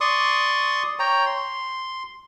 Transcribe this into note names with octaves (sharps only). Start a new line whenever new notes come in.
D5 C6 C#6 D#6
C#5 G5 A#5
C6